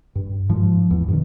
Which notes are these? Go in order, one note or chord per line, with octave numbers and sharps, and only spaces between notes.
G2
G#2 F3
E2
G2 B2 D#3